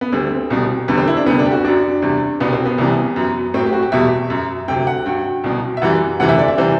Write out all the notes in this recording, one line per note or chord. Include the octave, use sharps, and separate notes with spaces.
B3
D2 D3 G3 C4
C2 B2 G3
E2 D3 G3 B3
C4
E4
D4
D2 C3 G3 B3
D4
G4
F#4
F#2 F#3 D4
E2 C3 G3
C2 B2 G3 B3
C4
B3
C2 C3 E3 G3
F#2 F#3
A2 F#3 C4
G4
F#4
G4
E2 B2 G3 E5
F#2 F#3
D2 C3 F#3 G5
F#5
G2 F#3 G5
C2 B2 F#3
E5
F#2 E3 G3 F#5
D2 C3 E3 G3 F#5
E5
D5
E5
C3 E3 G3 C5